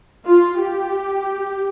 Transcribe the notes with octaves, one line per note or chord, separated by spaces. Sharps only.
F4
G4